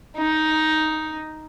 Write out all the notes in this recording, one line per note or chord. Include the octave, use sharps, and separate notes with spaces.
D#4